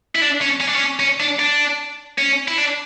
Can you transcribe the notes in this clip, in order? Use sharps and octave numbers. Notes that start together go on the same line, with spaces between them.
E4
D4
C#4
C#4
D4
C#4
C#4
D4
D4
C#4
E4
D4